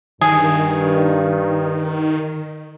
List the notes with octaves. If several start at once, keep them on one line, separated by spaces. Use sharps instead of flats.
G2 D#3 G#4